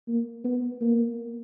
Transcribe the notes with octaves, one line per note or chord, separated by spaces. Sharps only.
A#3
B3
A#3